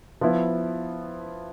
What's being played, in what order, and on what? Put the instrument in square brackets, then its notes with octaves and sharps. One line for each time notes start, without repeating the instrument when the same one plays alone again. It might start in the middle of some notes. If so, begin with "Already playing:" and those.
[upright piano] F3 B3 E4